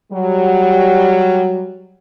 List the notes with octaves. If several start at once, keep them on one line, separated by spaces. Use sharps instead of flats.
F#3 G3